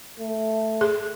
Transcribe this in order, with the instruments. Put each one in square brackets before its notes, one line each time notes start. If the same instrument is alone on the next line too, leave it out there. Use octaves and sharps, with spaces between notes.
[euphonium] A3
[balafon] G#4